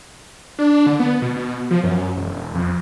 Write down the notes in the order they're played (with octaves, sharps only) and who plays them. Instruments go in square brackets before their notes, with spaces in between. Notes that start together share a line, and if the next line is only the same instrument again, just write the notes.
[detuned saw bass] D4
D3
B3
B2
B2
F3
F#2
E1
F2